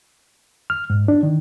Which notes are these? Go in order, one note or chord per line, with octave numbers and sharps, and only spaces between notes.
F6
G#2
D4
D#3